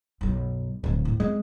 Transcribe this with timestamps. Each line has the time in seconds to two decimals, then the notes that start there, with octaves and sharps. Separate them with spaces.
0.21 B1 F#2
0.84 D1 A#2 F3
1.05 A2
1.20 G#3 C4 F4